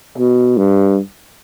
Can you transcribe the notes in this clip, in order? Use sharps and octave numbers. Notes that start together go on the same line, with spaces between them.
B2
G2